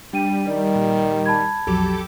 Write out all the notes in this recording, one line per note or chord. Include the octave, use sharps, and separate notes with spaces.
G3 D4 G5 D#7
D#3 D5
A#2
A5 B5 G#6
B1 F2 F#3 G4 A4 D6